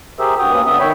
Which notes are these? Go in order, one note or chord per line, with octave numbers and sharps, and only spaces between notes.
G4 G#4 A#4 C5 E5 E6
G2 F#4 G5 D#6
D2 A#3 C#4 B4 D#6
D3 B3 E5 D#6
D#3 C#5 E5 G5 B5